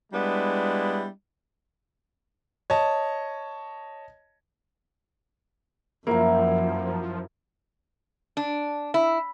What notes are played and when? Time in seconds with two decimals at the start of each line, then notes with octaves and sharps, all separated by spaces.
0.13 G3 G#3 B3 D4 E4
2.70 C#5 D#5 A5
6.07 F#2 F3 A#3 E4 F#4 A#4
8.37 D4
8.94 E4